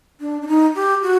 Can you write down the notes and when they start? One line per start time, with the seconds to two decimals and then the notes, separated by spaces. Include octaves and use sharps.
0.21 D4
0.42 D4
0.48 D#4
0.75 G4
1.03 F#4